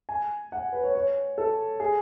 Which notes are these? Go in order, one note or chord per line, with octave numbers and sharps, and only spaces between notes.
G#5
F#5
B4
C#5
C#5
A4
G#4